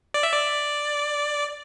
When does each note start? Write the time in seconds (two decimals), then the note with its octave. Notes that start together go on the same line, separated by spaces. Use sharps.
0.14 D5
0.23 E5
0.32 D5